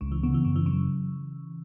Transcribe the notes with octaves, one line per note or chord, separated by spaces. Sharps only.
C#2 C#3
E3
C#3 B3
E3
F#2 C#3
E3
C#3 F#3